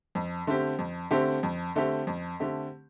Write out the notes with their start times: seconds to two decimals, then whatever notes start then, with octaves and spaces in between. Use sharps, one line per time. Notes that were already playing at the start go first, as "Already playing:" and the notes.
0.15 F2
0.47 D3 A3 C4 G4
0.79 F2
1.11 D3 A3 C4 G4
1.43 F2
1.76 D3 A3 C4 G4
2.07 F2
2.40 D3 A3 C4 G4